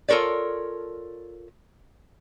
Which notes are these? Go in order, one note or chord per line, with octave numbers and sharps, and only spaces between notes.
F4 A4 A#4 C#5 D5